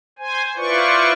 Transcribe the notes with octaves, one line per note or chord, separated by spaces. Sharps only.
C5 G#5
E4 F4 B4 C5 D5 C#6